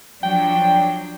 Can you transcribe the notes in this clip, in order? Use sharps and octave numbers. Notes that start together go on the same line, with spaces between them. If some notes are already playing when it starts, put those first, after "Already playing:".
F3 F#3 D4 G5